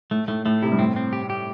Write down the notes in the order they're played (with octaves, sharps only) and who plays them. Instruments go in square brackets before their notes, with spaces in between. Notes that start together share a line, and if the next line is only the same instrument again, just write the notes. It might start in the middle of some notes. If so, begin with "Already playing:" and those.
[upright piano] A2 [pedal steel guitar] A3
[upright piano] A2 [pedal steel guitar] A3
[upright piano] A2 [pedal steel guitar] A3
[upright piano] C3 [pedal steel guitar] E4
[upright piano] G2
[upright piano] A2 [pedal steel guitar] C4
[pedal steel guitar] C4
G4
G4